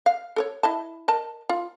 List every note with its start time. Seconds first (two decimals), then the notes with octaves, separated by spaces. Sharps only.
0.06 F5
0.36 A4 A#4 C#5
0.63 E4 D#5 A5
1.08 A#4 D#5 A5
1.49 F4